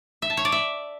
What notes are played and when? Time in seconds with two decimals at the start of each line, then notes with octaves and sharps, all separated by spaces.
0.22 E5
0.30 A5
0.37 C#5
0.45 D5
0.52 E5